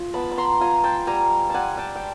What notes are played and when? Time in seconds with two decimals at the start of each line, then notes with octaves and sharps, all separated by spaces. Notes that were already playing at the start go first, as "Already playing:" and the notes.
Already playing: F4
0.14 B3 A5 B5
0.32 B5
0.37 A#5 C6
0.60 F4 G#5 A#5
0.84 G5 A5
1.07 G3 G#5 A#5
1.50 G3 F#5 G#5 A5
1.77 G5 A5
1.95 G5